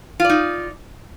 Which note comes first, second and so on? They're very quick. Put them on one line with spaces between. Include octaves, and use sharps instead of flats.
F4 D5 D#4